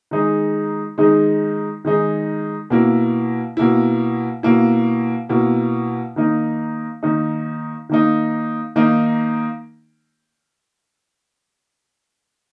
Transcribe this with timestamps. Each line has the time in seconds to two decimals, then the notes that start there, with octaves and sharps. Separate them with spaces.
0.11 D#3 G#3 D#4 G#4
0.98 D#3 G#3 D#4 G#4
1.85 D#3 G#3 D#4 G#4
2.70 B2 A#3 E4
3.57 B2 A#3 E4
4.43 B2 A#3 E4
5.29 B2 A#3 E4
6.16 D#3 A#3 D#4
7.03 D#3 A#3 D#4
7.89 D#3 A#3 D#4
8.76 D#3 A#3 D#4